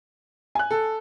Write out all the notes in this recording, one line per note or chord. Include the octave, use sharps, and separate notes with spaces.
G#5 F#6
A4